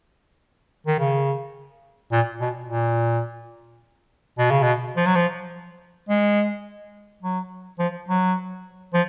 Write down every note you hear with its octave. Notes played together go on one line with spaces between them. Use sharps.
D#3
C#3
A#2
B2
A#2
B2
C#3
B2
F3
F#3
F3
G#3
F#3
F3
F#3
F3